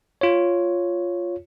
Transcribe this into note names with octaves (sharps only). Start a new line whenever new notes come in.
F4 C#5